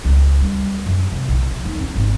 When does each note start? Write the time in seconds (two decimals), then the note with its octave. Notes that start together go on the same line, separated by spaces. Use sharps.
0.05 C#2
0.40 G3
0.86 F#2
1.12 C3
1.28 B1
1.51 F3
1.65 D#2
1.78 C#4
1.96 G#1